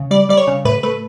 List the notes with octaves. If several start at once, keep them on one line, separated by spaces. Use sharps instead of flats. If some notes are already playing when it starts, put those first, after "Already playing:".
Already playing: C#3
G3 D5
G3 D5
C#5
C#3
A2 B4
A3 B4